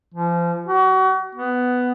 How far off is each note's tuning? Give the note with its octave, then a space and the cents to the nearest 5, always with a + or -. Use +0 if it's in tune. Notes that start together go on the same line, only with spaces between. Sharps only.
F3 -30
F#4 +30
B3 +10